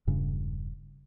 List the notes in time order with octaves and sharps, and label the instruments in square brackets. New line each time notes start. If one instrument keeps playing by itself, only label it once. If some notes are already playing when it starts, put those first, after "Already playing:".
[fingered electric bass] E1 G2 C#3